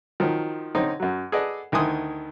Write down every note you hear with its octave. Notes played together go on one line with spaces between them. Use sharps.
D#3 F3 F#3
D3 C4 C#4 D#4
F#2 F#3
G#4 A4 B4 D5 D#5 F#5
D2 D#3 E4 G#5 C6 D#6